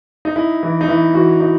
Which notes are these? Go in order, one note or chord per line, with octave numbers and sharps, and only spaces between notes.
D#4
D#4 E4
E3
D#4
E3 E4
E3 F#4
D#4